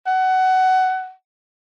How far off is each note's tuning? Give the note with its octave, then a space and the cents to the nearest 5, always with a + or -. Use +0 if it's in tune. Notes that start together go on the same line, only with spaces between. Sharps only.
F#5 +20